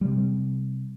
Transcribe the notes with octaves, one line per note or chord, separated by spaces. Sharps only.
C3 G3